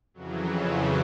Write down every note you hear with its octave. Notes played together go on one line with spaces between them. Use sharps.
F2 C#3 E3 F#3
F#3